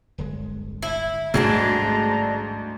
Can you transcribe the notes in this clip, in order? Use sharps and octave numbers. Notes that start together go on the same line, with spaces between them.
D1 G1 G#3
E4
A1 D2 G#2 G3 G#3 C4 D4 A#5